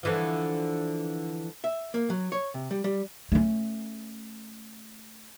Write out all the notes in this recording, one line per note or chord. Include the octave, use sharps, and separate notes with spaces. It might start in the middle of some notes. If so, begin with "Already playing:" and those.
D3 E3 F3
E5
A#3
F#3
C#5
C3
G3
G3
A3 C#4